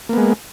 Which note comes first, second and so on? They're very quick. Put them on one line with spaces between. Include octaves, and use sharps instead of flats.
A#3 B3 G#3